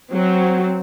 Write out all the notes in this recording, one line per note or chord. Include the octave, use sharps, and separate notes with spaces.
F#3 C4